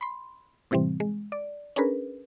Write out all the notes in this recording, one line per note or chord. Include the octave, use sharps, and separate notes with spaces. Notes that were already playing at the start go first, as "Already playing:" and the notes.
B5 C6
A2 C3 E3 G3 C4
G#3
D5
C#4 D4 G#4 A#4 B4